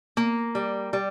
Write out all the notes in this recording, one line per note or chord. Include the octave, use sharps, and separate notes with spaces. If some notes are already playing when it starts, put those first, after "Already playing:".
A#3
G3
G3